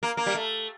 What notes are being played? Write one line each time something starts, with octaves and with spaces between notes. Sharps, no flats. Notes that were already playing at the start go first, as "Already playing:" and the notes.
A#3
A#3
G3
A3